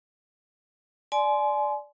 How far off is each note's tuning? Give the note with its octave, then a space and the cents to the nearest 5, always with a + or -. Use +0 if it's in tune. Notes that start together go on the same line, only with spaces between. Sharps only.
D5 +0 G#5 +35 C6 -15